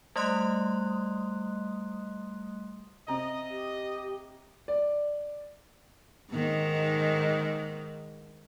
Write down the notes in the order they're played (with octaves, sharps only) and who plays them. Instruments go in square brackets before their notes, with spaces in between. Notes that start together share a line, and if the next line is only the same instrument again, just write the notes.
[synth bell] G3 A3 D#5 C6 D#6 F#6
[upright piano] C3 A#5 [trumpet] D#5
[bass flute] G4
[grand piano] D5
[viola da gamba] G#2 D#3